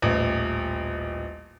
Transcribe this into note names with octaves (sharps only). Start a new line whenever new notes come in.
D#1 A1